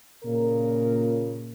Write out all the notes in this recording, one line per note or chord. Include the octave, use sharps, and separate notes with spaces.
A#2 C#3 A#4